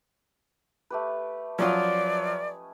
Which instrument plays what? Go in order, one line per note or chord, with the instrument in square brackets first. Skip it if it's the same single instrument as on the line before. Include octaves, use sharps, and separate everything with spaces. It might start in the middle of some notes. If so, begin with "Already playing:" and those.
[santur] A3 G4 B4
[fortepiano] F3 F#3 F4 [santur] C#4 D#5 [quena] D5